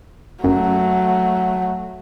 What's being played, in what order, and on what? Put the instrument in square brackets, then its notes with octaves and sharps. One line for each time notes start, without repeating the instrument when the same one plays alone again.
[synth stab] G1 F#2 [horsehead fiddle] F#3 A3